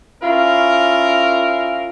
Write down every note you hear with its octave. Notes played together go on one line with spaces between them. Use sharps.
C#4 E4 F4 A#4